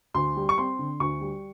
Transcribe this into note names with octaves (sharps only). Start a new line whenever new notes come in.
D2 C6
G3
C#6
C4 C6
D3
D2 C#6
G3